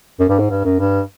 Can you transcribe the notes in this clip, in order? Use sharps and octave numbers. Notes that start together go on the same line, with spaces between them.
F#2
G2
G#2
G2
F#2
G2